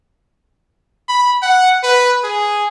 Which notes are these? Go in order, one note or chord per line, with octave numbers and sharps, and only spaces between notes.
B5
F#5
B4
G#4